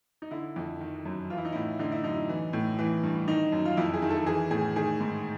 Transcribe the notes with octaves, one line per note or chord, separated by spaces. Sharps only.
D#4
D3 E4
F2
D#3
F#2
E3 F4
E4
D#4
A2 E4
D3 D#4
E4
F#2 D#4
E3
A2
E3
G2
D#3 D#4
F#2
F4
F2 E4
G#4
D#3
A4
E3 G#4
A2 G#4
D#3 G#4
G#2